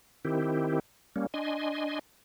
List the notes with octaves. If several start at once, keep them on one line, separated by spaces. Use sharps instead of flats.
D#3 C4 E4 G4
G3 A#3 C#4
D4 D#5 G#5 C6